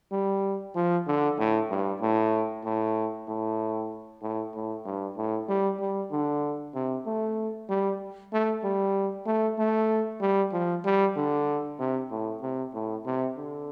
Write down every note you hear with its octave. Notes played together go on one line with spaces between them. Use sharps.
G3
F3
D3
A2
G2
A2
A2
A2
A2
A2
G2
A2
G3
G3
D3
C3
A3
G3
A3
G3
A3
A3
G3
F3
G3
D3
C3
A2
C3
A2
C3
D3